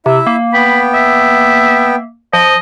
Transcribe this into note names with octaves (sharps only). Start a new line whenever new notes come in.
C3 E4 E5
A#3
B3 G5 B5
E5
F3 D#5